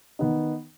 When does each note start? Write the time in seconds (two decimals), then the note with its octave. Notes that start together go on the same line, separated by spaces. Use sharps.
0.19 D#3 B3 D#4